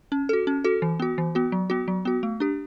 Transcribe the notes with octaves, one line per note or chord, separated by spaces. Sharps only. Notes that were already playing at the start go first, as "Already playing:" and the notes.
C#4
F#4 A4
C#4
F#4 A4
E3
B3 F#4
E3
B3 F#4
F#3
B3 F#4
F#3
B3 F#4
A3
D4 G4